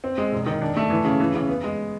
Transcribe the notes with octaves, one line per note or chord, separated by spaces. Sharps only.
C4
G#3
E1
D#3
D4
A3
E3
C#3
E3
C#3
B3
G#3